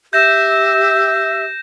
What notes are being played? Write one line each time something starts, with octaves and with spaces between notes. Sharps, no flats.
G4 E5 G6 A#6 E7